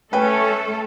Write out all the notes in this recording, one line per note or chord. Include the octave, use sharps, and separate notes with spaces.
A3 C#4 A4 B4 G5